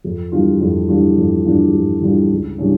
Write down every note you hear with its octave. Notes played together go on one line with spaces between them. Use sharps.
F2
E3 G3 D4 F4
F2
E3 G3 D4 F4
F2
E3 G3 D4 F4
F2
E3 G3 D4 F4
C#2
C#3 E3 G3 D4